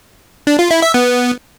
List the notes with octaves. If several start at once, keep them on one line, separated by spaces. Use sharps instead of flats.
D4
F4
E4
E5
B3